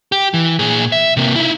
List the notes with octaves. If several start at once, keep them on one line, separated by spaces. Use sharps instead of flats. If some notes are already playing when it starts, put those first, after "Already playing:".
G4
E3
A#2 G#4
E5
C3 A#3
D#4 E4